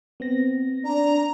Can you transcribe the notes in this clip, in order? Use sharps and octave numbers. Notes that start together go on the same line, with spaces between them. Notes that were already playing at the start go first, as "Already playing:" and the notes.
B3 C4 A#6
D4 A#5